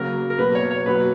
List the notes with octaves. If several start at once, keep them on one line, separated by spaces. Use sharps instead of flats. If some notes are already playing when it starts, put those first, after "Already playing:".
Already playing: C#3 F#3 A#3 A#4
A#4
B2 F#3 A#3 B4
C#5
C#5
B2 F#3 A#3 B4